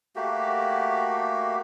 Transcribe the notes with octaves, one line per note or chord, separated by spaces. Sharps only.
A3 A#3 F#4 G4